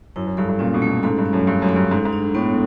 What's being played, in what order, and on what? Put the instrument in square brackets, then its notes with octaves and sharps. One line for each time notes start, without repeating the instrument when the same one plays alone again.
[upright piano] F#2 [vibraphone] E4
[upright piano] F#2
[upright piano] G2 [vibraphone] A4
[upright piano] G2
[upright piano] A#2 [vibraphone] C#4
[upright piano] B2
[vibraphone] A3
[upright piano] A#2
[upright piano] G#2 [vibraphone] A4
[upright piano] G2
[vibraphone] C#4
[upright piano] F#2
[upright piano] G2 [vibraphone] A3
[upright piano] F#2
[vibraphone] A4
[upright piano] G2
[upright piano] G#2 [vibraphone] F#3
[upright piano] G#2
[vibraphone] D4
[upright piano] A2 [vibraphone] B3